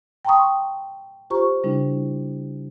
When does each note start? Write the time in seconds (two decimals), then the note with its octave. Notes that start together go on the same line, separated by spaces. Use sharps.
0.25 G5 A5 A#5 C6 C#6 D#6
1.30 F4 G4 C5 A#5 C#6
1.63 C#3 G3 D4 E4